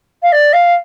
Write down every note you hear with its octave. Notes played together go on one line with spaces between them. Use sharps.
F5
D5
F5